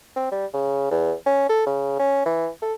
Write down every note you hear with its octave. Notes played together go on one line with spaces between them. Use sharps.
C4
G3
C#3
E2
C#4
A4
C#3
C#4
E3
A4